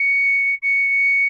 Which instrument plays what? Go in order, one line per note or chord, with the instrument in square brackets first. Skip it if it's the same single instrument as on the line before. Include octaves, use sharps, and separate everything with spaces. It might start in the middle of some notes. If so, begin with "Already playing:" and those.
Already playing: [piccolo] C#7
C#7